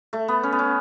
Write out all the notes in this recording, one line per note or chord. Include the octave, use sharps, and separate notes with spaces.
A3
B3
C#4
B3
C#4